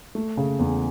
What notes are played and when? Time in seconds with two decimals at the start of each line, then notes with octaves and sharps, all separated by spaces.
0.15 A3
0.37 C#3
0.59 E2